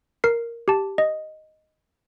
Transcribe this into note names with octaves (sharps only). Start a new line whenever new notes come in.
A#4 C7
G4 A5
D#5